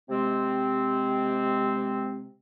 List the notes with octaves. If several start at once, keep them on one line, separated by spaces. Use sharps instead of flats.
C3 G#3 C4